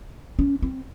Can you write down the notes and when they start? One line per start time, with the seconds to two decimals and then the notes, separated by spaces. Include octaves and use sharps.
0.39 C#4
0.62 C4